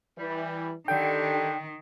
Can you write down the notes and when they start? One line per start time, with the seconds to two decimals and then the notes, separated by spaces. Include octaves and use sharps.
0.18 E3 G3
0.88 D3 D#3 D4 G4 A4 G5